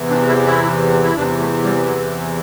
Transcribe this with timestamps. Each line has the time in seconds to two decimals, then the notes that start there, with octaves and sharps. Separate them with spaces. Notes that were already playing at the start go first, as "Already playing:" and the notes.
Already playing: E2 C3 E3
0.10 D4
0.28 E4
0.46 E4
1.03 E4
1.16 E2 C3 E3 D4
1.40 A3
1.64 G3
1.87 F#3